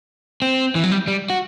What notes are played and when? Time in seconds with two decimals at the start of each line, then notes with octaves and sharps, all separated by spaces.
0.42 C4
0.75 E3
0.83 F#3
0.91 G3
1.08 G3
1.30 F#4